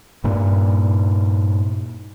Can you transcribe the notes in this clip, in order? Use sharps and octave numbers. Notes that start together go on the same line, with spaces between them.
G2 A#2